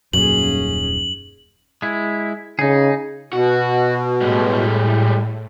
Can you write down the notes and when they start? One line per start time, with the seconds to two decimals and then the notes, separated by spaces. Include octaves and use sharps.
0.13 D#1 F#2 C#4 G#4 F#7
1.82 G#3 E4
2.59 C#3 D#4 G#4
3.33 B2 F#4
4.21 A2 G3 G#3